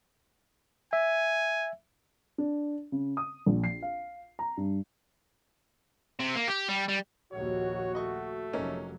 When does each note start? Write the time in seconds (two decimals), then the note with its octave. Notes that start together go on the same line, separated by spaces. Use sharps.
0.93 E5 G#5
2.38 D4
2.92 C#3
3.17 D#6
3.46 A#1
3.64 C7
3.82 F5
4.39 A#5
4.57 G2
6.19 C3
6.35 A#3
6.48 G4
6.69 G3
6.89 G3
7.33 A#1 D#2 F#4 C#5
7.95 A3 D#5 C#6
8.53 F1 F#3 A#3 C#4 D#4